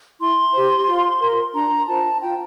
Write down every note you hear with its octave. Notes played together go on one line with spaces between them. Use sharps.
E4 C6
G4 C5
F4
A#4
D4 A#5
F4 C5 A5
F4 G5